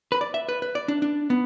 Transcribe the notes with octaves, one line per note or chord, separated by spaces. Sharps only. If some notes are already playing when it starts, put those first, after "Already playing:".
B4
D5
E5
B4
B4
D5
D4
D4
B3